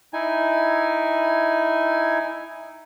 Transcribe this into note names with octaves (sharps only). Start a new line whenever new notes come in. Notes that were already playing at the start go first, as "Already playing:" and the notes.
D#4 E4 G#5